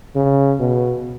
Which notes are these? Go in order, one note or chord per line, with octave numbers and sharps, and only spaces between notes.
C#3
B2